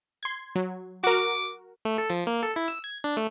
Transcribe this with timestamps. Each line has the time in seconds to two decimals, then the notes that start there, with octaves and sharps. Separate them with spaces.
0.23 C6 G#6
0.55 F#3
1.04 F#4 A#4 D6
1.85 A3
1.98 A4
2.10 F3
2.27 A#3
2.43 A4
2.56 E4
2.68 E6
2.84 G#6
3.04 D4
3.17 A3